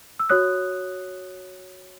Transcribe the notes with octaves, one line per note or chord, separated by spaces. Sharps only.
E6
F#4 C#5 D#6 F#6